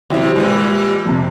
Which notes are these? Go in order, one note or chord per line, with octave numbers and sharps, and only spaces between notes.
D#2 C3 F#3 E4
A#2 E3 G3 G#3
F2 C3